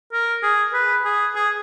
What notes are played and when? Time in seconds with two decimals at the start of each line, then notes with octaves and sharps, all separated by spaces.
0.13 A#4
0.43 G#4
0.73 B4
1.05 G#4
1.35 G#4